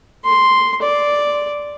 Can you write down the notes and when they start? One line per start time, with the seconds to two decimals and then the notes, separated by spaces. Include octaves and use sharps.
0.25 C6
0.82 D5